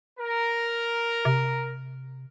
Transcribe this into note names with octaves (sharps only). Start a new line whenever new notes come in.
A#4
C3